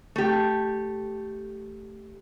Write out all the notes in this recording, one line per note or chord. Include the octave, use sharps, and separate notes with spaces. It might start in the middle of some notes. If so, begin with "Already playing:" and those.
A3 G4